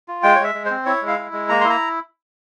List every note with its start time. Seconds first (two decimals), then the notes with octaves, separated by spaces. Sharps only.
0.08 F4
0.23 G#3 G5
0.35 C#5
0.40 G#3 E5
0.55 G#3
0.65 C5
0.70 C4
0.86 E4 C#5
1.02 G#3
1.08 F5
1.18 E4
1.33 G#3
1.49 A#3 A#5
1.61 C6
1.65 E4
1.70 A#5